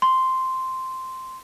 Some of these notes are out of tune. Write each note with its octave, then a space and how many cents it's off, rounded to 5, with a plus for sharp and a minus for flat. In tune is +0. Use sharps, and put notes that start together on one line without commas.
C6 -5